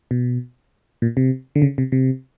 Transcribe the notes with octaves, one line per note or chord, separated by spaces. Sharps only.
B2
A#2
C3
D3
C#3
C3
C3